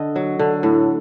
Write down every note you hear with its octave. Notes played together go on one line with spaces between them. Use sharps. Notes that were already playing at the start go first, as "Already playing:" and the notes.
Already playing: D3 D#5
F#3
D3
A2